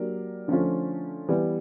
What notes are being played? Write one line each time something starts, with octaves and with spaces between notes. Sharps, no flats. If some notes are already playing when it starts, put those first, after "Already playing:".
Already playing: F#3 A#3 D4 G4 A#4
D3 F3 A3 C#4 F4
E3 G3 B3